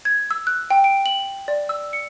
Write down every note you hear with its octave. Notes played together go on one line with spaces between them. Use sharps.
G#6
E6
F#6
G5
D7
F#7
D5
E6
C#7